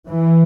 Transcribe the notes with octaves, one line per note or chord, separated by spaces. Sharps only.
E3